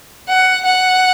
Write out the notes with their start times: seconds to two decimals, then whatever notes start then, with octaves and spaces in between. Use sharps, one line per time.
0.28 F#5
0.65 F#5